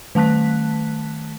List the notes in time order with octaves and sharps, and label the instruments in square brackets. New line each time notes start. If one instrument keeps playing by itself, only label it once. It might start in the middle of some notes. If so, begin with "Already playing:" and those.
[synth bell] D#3 A3 A5 F#6 B6